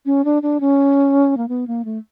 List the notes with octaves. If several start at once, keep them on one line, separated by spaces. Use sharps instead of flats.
C#4
D4
D4
C#4
A#3
B3
A#3
A3